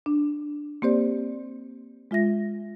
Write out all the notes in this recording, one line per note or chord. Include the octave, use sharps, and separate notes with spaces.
D4
A#3 C4 G4 C5 D5
G#3 F4 E5 A#6